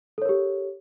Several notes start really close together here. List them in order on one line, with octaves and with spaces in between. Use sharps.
A4 C#5 A#4 G4